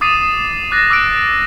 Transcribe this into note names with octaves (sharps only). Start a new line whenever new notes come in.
D6 D#6 A6 C7 D#7
D6 F#6 A6 A#6
D6 E6 F#6 D7